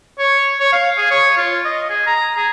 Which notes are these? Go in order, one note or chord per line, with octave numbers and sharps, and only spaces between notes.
C#5
C#5
F5
G#4
C#5
F4
D#5
G#4
A#5
G#4